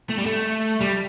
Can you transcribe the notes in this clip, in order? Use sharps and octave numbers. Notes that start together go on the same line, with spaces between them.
A3
G3
A3
G3